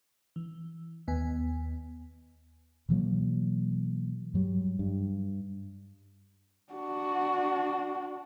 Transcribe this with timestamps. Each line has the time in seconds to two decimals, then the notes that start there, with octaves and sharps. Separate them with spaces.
0.36 E3
1.08 D#2 B3 G#5
2.89 B2 E3 F#3 A#3
4.34 G2 F#3 G3
4.79 G2
6.73 D4 F#4